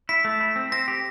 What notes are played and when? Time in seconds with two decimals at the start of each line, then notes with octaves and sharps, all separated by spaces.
0.09 E4 B6
0.25 A3
0.40 E4
0.56 C4
0.72 C4 A#6
0.88 G4